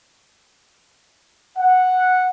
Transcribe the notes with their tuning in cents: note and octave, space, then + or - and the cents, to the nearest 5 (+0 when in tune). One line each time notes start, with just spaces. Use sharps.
F#5 -5